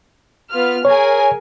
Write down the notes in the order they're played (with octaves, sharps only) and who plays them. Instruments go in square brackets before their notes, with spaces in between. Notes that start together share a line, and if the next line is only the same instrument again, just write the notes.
[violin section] B3 F4 F6
[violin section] G#4 A#4 G#5 [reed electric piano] C#5